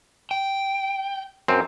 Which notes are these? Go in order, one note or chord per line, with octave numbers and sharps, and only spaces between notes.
G5
F#2 C4